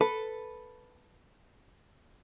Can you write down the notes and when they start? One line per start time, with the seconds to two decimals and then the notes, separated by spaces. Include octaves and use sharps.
0.01 A4 B4